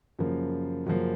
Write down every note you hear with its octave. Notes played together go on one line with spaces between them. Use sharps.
F#2 C#3 F3 A#3
F#2 C#3 F3 A#3